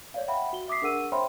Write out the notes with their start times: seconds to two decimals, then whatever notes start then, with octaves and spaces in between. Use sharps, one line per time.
0.14 C#5 D5 F5
0.28 E5 F#5 G5 B5
0.53 F#4 G7
0.68 E5 D6 D#6 B6 C7
0.82 D4 G#4 A#4 F#5 E6 D#7
1.12 C5 C#5 E5 G5 B5 C6